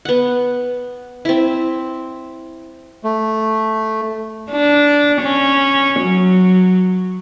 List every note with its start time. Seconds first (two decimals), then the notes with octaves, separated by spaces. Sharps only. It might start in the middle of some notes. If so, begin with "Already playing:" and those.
0.05 B3 F#5
1.25 C4 E4
3.04 A3
4.51 D4
5.22 C#4
6.00 F#3